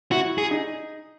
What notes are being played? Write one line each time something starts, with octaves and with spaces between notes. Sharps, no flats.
E4 F#4
G#4
D#4